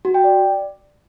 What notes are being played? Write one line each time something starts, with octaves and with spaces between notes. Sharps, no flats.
F#4
G5
D5